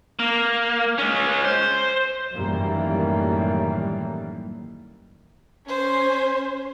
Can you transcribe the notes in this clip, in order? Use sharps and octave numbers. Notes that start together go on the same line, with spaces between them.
A#3
G#3 C#4
C5
F#2 A2 D#3 E3 G3 A#3
C#4 C5